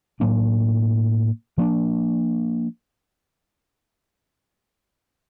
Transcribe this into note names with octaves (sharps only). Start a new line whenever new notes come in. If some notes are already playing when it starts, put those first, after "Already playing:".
A2 F#3 A#3 D4
F3 A#3 D4